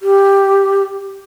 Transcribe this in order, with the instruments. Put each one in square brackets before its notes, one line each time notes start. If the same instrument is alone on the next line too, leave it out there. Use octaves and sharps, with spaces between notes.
[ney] G4